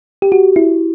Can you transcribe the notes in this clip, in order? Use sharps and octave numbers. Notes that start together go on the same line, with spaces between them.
G4
F#4
E4